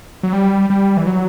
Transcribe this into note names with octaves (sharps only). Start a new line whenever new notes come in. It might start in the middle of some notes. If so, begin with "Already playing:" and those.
F#3
G3
G3
E3
F#3